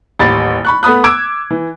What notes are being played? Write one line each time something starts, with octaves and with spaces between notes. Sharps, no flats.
D#1 A1 G4 B5 A6
B5 C#6 F#6
A3 B3 B5 D#6 F#6
D6 E6 G#6 D7
E3